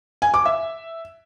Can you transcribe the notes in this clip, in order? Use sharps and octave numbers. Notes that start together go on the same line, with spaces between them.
G#5
D6
E5